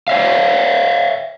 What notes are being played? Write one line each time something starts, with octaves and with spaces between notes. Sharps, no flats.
C#5 E5 F5